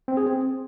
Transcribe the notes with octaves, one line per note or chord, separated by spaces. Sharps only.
C4
G#4
C4